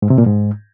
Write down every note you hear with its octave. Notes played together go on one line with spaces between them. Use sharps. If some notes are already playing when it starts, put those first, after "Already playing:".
G#2
C3
A#2
G#2